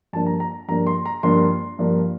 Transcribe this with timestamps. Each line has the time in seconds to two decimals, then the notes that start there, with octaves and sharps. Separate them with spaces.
0.13 G2 F3 A#3 D4 A5
0.27 A#5
0.40 A#5
0.68 G2 F3 A#3 D4 A#5
0.87 C6
1.06 A#5
1.23 G2 F3 A#3 D4 C6
1.79 G2 F3 A#3 D4